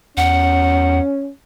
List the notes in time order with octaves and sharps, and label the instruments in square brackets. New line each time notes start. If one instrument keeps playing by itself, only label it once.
[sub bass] E2 [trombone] C#4 [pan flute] F#5